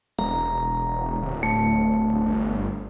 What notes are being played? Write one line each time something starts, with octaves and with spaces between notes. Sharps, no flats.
E1 A#5
D1
A3
G1